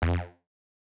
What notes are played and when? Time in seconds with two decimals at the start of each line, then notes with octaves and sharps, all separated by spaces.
0.02 E2
0.08 F2